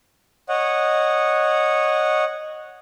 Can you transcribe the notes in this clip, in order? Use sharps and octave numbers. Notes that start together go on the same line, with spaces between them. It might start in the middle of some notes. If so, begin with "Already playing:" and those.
C#5 D#5 F#5